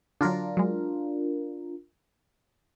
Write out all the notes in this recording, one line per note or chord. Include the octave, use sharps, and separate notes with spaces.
D3 F#3 D4 F4 A#4
F#3 G#3